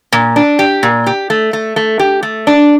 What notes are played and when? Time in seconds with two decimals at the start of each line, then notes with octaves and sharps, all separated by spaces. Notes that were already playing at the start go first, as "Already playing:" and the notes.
0.12 A#2
0.36 D4
0.59 G4
0.83 A#2
1.06 G4
1.30 A3
1.53 A3
1.76 A3
1.99 G4
2.23 A3
2.47 D4